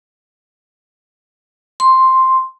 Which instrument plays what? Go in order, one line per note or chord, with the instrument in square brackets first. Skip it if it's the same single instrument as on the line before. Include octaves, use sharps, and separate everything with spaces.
[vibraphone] C6